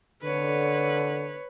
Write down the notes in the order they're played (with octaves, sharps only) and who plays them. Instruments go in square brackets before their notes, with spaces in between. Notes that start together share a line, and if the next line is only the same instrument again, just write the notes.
[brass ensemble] D3 [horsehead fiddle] B4 C#5